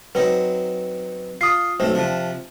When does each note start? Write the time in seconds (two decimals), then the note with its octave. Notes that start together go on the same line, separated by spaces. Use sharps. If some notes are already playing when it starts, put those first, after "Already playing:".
0.15 F#3 C4 D#4 B4
1.41 F4 D#6 C7
1.80 B1 A3 C4 C5
1.95 C3 F3 D4